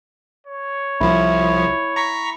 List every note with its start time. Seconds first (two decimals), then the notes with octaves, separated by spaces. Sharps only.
0.47 C#5
1.00 C2 F3 E4
1.96 A#5 C#6 B6